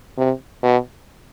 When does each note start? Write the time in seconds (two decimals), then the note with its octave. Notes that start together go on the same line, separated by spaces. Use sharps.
0.17 C3
0.63 B2